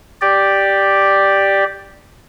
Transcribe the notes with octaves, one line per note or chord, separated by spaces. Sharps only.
G4 D5